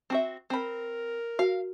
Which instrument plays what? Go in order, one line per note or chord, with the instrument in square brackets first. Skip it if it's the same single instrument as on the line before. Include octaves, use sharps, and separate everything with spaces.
[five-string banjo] C4 F#4 E5
[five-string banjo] C4 B5 [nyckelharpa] A#4
[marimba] F#4 [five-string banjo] F5